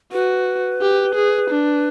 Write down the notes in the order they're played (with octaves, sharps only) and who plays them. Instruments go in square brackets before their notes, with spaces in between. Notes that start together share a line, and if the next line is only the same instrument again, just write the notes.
[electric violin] F#4 [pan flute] B4
[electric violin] G4
G#4
D4